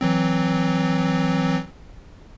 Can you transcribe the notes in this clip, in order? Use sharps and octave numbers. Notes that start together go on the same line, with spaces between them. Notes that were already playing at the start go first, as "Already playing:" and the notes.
E3 F#3 C4